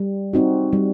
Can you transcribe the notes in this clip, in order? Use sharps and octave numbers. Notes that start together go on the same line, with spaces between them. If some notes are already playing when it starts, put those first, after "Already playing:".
Already playing: G3
C4 D#4 F#4
G3